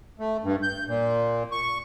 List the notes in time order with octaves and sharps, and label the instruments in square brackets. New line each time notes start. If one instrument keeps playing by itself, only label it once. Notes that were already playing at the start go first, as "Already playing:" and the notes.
[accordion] A3
G2
G6
A#2
C#6